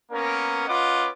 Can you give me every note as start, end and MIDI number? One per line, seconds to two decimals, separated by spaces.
0.12 0.64 58
0.12 0.64 59
0.12 0.64 61
0.12 0.64 70
0.67 1.08 61
0.67 1.08 65
0.67 1.08 71
0.67 1.08 75
0.67 1.08 78
0.67 1.08 86